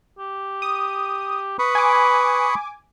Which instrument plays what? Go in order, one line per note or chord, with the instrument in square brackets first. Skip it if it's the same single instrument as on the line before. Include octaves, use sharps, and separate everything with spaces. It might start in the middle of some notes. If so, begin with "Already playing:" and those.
[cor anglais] G4
[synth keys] D#6
[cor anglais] B4 [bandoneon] B5 C#6 D#6
[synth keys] G#5 D6